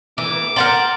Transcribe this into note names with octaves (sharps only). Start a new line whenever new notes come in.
E3 D6
A#4 F#5 G5 A#5 C6 A6